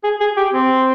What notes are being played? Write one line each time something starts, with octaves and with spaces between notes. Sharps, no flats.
G#4
G#4
G4
C4